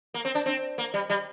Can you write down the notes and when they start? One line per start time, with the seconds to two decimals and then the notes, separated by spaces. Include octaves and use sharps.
0.14 A#3
0.25 C4
0.35 D4
0.46 C4
0.78 A#3
0.94 G3
1.10 G3